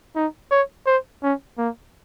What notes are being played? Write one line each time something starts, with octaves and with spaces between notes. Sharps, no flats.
D#4
C#5
C5
C#4
A#3